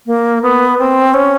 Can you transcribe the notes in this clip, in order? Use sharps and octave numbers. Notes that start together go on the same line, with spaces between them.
A#3
B3
C4
C#4